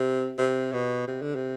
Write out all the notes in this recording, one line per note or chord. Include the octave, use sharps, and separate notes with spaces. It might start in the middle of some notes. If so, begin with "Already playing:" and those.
Already playing: C3
C3
B2
C3
D3
C3